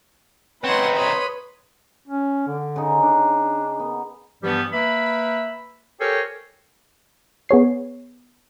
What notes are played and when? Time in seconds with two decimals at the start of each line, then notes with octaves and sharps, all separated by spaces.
0.64 C4 D#4 B4 C#5 F#5 C6
0.97 C#5 B5 C6 D#6
2.08 C#4
2.47 D3
2.76 C#3 D#4
3.02 D4
3.79 B3
4.44 G2 E3 F3 G3 B3 G4
4.73 A#3 B4 E5 B5
6.01 G4 A4 A#4 C5 C#5 G#5
7.49 B3 G#4 C#5 C7